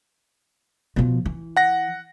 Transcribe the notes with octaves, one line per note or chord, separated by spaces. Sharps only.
B2 F3
E3
F#5 A#6